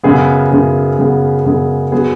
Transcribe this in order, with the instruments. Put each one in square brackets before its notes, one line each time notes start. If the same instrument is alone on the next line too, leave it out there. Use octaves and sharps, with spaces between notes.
[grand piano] F#2 C#3 B3 G#4
F#2 C#3 B3 G#4
F#2 C#3 B3 G#4
F#2 C#3 B3 G#4
F#3 B3 G#4